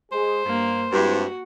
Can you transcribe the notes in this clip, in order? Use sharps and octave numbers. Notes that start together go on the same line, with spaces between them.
G#3 G#4 C5
G2 A#3
G2 G#3 C4 E4 F#4